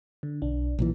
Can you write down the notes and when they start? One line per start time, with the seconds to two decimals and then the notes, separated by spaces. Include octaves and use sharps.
0.23 D3
0.42 B1 D4
0.79 B1 A#2 E3